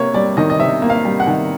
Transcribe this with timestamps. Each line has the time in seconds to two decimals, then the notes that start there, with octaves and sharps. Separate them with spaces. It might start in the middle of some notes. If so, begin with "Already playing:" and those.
Already playing: C3 A#3 C#5
0.14 G3 D5
0.37 D#3 D#5
0.50 D#5
0.59 C3 E5
0.82 A#3
0.90 F5
1.05 G3
1.20 F#5
1.27 D#3